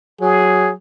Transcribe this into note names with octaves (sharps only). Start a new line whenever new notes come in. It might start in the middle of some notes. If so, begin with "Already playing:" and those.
F#3 G#4